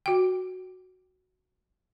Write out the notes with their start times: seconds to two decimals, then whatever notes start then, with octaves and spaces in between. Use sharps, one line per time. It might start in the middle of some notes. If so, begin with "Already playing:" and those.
0.06 F#4 G5